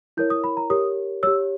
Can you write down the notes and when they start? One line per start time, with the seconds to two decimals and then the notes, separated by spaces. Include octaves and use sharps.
0.17 E4 A#4 C#5 G6
0.30 D#6
0.44 B5
0.57 A#5
0.70 G4 A#4 C#5 D#6
1.23 G4 C#5 E6